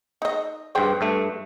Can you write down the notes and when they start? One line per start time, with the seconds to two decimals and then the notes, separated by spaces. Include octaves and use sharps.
0.22 D#4 D#5
0.75 G2 G#4 C5 G5
1.01 G2 A3